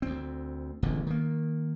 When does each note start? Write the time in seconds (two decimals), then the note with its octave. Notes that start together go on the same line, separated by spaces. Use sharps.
0.02 D2 C4
0.82 E1 A1 E2 D3
1.07 D#3 A#3